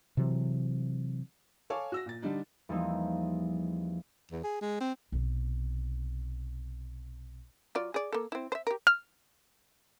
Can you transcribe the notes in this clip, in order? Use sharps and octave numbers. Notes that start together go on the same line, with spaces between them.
C3 E3 F#3
A4 C#5 F5 G#5 C#6 D6
F#4 E6 A#6
A#2 A6
D3 G3 D4 D#4
E2 F3 G3 A#3 C4 D#4
E2
G#4
G#3
C4
B1 C3
F#3 F4 D5
G#4 D5
A#3 A4
C4 E4
C5 E5
G4 A#4
F6